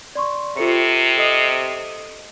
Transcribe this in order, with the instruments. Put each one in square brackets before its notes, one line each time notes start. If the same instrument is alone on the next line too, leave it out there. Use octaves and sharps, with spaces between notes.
[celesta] D5 C6 C#6
[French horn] C3 [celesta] F4 A4 C#7
[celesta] A4 D#5 D#6